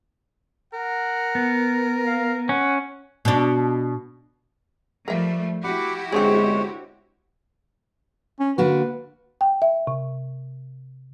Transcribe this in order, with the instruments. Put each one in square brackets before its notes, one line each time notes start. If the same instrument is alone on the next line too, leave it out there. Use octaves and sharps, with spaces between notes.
[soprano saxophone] A#4 [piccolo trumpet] F#5
[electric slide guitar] B3
[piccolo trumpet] F5
[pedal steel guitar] C#4 [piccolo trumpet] F#5
[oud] B2 D4
[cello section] F3 G3 A3 [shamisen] A#4 E5
[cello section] E4 F#4 G4 [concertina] F#5 B5 D6
[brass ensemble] G1 C3 G#3 [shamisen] C4 D4 G#4 [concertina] C5 C#5
[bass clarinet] C#4
[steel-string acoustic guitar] D3 A#3 F#4 [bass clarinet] B4
[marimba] G5
E5
C3